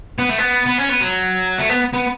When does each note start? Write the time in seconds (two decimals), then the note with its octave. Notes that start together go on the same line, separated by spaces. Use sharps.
0.19 B3
0.29 A3
0.38 B3
0.66 B3
0.78 C#4
0.89 B3
1.00 F#3
1.58 A3
1.69 B3
1.94 B3